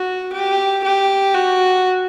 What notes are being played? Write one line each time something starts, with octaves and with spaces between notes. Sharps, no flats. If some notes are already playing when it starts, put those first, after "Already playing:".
Already playing: F#4
G4
G4
F#4